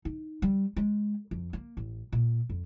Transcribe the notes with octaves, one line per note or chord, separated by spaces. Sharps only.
D#4
G3
G#3
F2
A#3
A1
A#2
F2